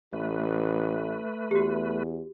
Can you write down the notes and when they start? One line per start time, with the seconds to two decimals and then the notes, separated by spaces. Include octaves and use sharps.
0.13 A1 A3 B4
1.51 E2 F#4 G4